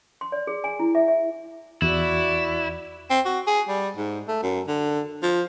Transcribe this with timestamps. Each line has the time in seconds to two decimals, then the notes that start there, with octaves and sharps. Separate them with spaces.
0.21 C6
0.32 D5
0.47 G#4
0.64 G#5
0.80 E4
0.95 E5
1.08 E5
1.82 E2 E4 F#4 D5
3.10 C4
3.25 F#4
3.47 G#4
3.68 G3
3.97 G#2
4.28 A3
4.43 F#2
4.67 D3
5.23 F3